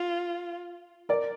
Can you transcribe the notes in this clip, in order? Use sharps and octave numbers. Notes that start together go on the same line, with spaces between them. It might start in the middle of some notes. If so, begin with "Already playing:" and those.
Already playing: F4
A#4 D5